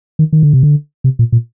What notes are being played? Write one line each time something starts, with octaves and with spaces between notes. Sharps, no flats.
D#3
D#3
D3
C3
D3
C3
A#2
A#2